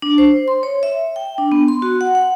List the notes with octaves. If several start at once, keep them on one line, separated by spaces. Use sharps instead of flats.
D4
C5
C6
C#5
E5
G5
D4
B3
C6
F#4
F#5
F#5